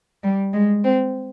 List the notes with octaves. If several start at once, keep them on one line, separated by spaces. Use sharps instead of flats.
G3
G#3
C4